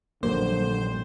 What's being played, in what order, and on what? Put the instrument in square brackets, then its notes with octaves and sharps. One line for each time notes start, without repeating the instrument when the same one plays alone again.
[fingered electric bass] A#1 G2 [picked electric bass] A#2 F#3 A#3 [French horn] D3 [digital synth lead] C5